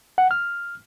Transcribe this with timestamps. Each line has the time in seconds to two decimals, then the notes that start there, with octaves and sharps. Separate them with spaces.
0.18 F#5
0.31 F6